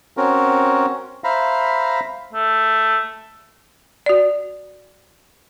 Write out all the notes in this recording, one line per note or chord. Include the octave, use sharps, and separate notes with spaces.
C4 C#4 F#4 A#4
C5 E5 F5 A#5 B5
A3
F#4 D5